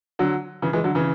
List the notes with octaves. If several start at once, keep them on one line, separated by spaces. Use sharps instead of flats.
D3 F#3
C#3 E3
E3 G#3
D3 F#3
C#3 E3